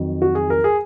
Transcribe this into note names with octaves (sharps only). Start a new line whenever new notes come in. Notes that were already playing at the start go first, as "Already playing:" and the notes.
Already playing: F2 D#3 F#3
F#4
G#4
A#4
G#4